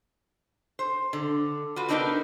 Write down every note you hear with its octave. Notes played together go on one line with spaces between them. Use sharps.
C5
D3
F4 F#4 B4
B3 C4 D4 D#4 A#4 B4